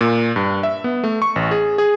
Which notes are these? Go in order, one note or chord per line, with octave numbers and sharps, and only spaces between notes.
A#2
G2
E5
B3
A3
C#6
A1
G#4
G#4